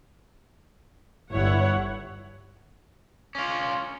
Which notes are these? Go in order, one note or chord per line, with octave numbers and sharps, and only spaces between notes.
G1 E4 C#5 F#5
C#4 F4